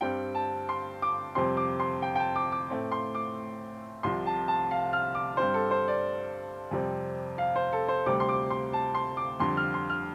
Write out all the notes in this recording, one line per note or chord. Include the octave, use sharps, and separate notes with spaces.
G2 G3 C4 G5
A5
C6
D6
F2 C3 G3 C4 C6
D6
C6
G5
G5
A5
D6
D6
A2 A3 C4
C6
D6
C2 C3 F3 C6
A5
A5
F5
F6
D6
G2 G3 C4 C5
A4
C5
D5
F2 C3 G3 C4
F5
C5
A4
C5
D2 C3 G3 C4 D6
C6
D6
C6
A5
C6
D6
F2 D3 G3 C6
F6
C6
F6